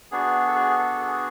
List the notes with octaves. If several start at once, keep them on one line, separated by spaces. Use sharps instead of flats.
B3 D4 F#4 G#4
A4
G#4
A4
G#4